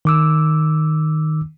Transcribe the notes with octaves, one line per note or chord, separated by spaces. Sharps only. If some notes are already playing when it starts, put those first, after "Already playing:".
D#3 D6 E6